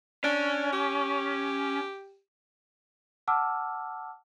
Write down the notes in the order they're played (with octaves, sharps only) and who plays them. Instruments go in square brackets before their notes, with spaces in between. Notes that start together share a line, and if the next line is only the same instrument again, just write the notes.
[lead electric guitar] C#4 [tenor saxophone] D4
[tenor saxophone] G4
[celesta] F#5 A5 D6 E6 F6